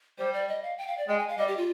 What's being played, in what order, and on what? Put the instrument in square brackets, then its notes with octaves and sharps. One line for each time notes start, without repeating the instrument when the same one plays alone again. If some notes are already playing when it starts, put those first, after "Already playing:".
[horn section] G3 [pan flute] C5
[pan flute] D5
D#5
F5
G5
F5
D5
[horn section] G#3 [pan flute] G5
[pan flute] G#5
F5
[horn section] G3 [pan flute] D#5
[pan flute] G4
F4